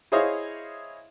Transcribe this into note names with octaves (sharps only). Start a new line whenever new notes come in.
E4 G#4 C5 C#5 D#5 F5